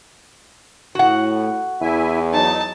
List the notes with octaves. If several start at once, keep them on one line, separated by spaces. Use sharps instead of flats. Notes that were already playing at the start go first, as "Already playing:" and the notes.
A2 F#4 F#5
E2 E4 E5 G#5
F#3 D#4 A5